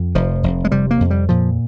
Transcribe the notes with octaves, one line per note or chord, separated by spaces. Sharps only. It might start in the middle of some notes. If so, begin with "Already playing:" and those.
Already playing: F2
F1 F3
F1
G#3
C3 G3
A#3
F2
G3
A#2 F3